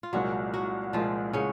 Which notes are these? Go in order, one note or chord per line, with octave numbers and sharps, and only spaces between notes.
F4
C2 A#2 F#3 G#3 F#4
F#3 F#4
C2 A#2 F3 G#3 F4
C#3 C#4